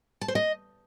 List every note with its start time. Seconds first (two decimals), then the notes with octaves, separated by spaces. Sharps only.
0.21 A5
0.28 C5
0.35 D#5